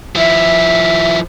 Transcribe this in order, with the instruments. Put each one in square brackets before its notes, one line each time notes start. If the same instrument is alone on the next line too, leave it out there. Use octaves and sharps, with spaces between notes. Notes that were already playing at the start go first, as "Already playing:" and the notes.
[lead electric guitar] F3 E4 [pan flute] E5